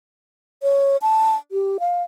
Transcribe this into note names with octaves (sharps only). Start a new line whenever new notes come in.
C#5
A5
G4
F5